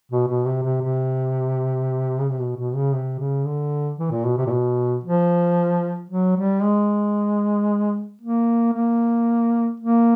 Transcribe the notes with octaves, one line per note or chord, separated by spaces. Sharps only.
B2
B2
C3
C3
C3
C#3
C3
B2
B2
C#3
C3
C#3
D3
E3
A#2
B2
C3
A#2
B2
F3
F#3
G3
G#3
A#3
A#3
A#3